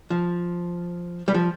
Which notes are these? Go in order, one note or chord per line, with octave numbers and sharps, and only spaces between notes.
F3
G3
F3